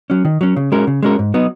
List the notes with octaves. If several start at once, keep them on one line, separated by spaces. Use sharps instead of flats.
F#3 C#4
D#3
F#3 C#4
C#3
G#3 C#4 F#4 A#4
C#3
G#3 C#4 F#4 A#4
G#2
F#3 B3 D#4